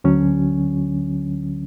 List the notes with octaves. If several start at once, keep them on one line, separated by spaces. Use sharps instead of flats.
D2 D3 F#3 C#4